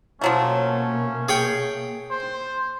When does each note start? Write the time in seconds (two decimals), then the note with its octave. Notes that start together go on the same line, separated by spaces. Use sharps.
0.21 B2 F3 F#3 A3 A#3 C#4
1.29 G#4 C#5 G5
2.11 C5